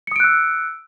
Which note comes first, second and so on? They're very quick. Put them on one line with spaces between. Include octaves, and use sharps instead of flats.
C#7 D#6 D7 F#6 E6